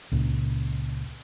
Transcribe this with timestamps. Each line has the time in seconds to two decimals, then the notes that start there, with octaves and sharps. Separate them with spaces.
0.12 C#2 A#2